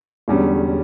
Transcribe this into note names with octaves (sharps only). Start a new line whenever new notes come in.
E1 E2 D3 G3 C#4